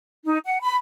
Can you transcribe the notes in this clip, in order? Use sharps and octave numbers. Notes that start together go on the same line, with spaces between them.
D#4
F#5
B5